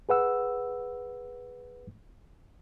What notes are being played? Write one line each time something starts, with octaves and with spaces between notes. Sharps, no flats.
G#4 B4 F#5 E6